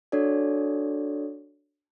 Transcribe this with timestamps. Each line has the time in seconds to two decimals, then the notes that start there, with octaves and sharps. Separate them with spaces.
0.12 D4 F#4 A4 C#5 D5